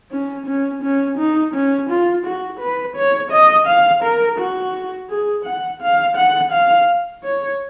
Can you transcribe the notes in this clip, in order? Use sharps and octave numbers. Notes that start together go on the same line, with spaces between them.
C#4
C#4
C#4
D#4
C#4
F4
F#4
B4
C#5
D#5
F5
A#4
F#4
G#4
F#5
F5
F#5
F5
C#5